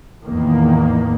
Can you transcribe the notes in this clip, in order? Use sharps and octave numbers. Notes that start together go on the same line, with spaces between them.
E2 A2 D#3 A#3